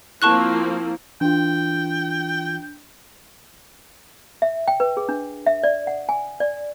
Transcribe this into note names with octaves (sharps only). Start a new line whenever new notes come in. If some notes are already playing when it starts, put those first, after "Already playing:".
F3 A#3 C4 E4 F5 A5 C#6 F#6
E3 D4 F4 G5
E5
G5
B4
G#4
D4
E5
D5
F#5
G#5
D5